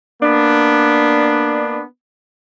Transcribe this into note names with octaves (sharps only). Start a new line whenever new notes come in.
A#3 B3 D4